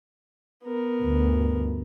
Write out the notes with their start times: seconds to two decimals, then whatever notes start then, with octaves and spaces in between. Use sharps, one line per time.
0.65 B3 A#4
1.01 D2 G2